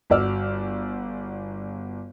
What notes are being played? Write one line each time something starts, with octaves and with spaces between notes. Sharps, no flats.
G1 F#4 D5 E6 F6